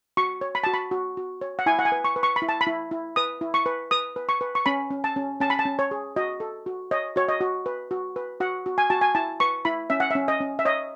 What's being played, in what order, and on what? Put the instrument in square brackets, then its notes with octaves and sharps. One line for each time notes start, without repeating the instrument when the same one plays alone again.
[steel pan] F#4 C#6
C#5
B5
F#4 A5
B5
F#4
F#4
C#5
F#5
E4 G#5
F#5
G#5
B4
C#6
B4
C#6
B5
E4
A5
B5
E4
E4
B4 D#6
E4
C#6
B4
B4 D#6
B4
C#6
B4
C#6
C#4 B5
C#4
A5
C#4
C#4 A5
B5
A5
C#4
C#5
G#4
F#4 D#5
A4
F#4
C#5 D#5
F#4 C#5
D#5
F#4
B4
F#4
B4
F#4 F#5
F#4
G#5
F#4 A5
G#5
E4 A5
B4 C#6
E4 B5
C#4 E5
F#5
C#4 E5
D#5
C#4
E5
C#5 D#5